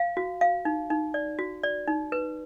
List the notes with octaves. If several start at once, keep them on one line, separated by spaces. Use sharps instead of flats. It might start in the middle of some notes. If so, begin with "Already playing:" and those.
Already playing: F5
F#4
F5
D#4
D#4
D5
F#4
D5
D#4
B4